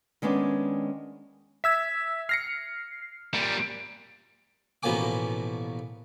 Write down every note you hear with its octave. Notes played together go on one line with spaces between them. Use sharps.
D#3 G#3 B3 C#4 D4
E5 E6 G#6 B6
F6 A#6 C7 C#7
A#2 G3
A1 B2 F3 A#3 G#5 D6